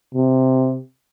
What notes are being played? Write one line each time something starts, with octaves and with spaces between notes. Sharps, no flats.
C3